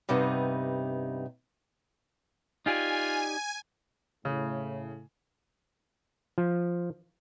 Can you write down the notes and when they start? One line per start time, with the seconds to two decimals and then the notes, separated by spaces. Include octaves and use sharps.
0.09 G2 C3 G3 B3 D#4
2.66 D#4 F4 G4 D5 G#5
4.25 A2 C#3
6.38 F3